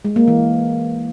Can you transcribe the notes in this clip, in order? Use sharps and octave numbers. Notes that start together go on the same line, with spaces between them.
G#3
A#3
E3